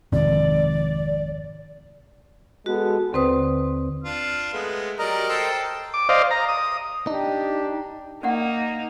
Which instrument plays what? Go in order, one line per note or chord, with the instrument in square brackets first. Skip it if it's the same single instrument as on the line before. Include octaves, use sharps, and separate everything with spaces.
[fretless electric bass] G#1 F2 [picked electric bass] C3 D#3 C4 [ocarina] D5
[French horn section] G#3 B3 A4 [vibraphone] F#4
[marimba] D#2 D3 C4 B4 C5 D#6
[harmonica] D4 F4 F6
G#3 A3 B3
[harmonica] F#3 G3 D5 [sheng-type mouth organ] A#4 D#5 A#5
[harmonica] A4 C5 G5
[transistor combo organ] D6
C5 D5 D#5 F5
A#5
D#6
[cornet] D4 [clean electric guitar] D#4 [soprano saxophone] G4
[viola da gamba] A#3 D#4 [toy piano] C#4 D5 F#5